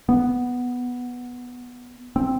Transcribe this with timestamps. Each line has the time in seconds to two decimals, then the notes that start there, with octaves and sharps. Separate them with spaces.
0.09 B3
2.16 C4